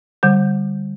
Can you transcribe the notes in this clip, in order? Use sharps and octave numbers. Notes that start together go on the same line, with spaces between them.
D3 G3 G6